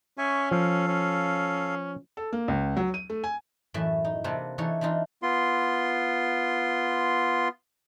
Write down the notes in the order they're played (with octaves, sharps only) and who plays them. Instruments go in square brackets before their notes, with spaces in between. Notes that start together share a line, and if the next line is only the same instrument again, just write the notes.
[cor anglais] C#4 [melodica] E5 G#5 C#6
[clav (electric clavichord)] F3 [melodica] A4 F5
[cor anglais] C#4
[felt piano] A4
A#3
C#2
F#3
D#7
A3
G#5
[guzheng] F#2 A2 E3 E5 A5
D#4
C3 A#3 C4 D4 A4 B4
E3 D4 D#4 A4 C#5
E3 C4 D4 D#4 F4
[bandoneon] B3 F4 C6